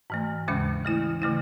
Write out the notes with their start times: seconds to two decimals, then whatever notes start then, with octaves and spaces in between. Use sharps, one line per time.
0.10 G#2 E3 A3
0.48 D#2 C#3 G#3 C#4
0.85 E3 A3 E4
1.22 C#3 E3 A3 E4